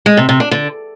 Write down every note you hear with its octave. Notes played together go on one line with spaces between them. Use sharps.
G#3
C3
C3
D4
D3